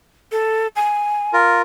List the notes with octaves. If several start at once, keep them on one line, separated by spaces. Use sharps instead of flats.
A4
G#5
F4 A#4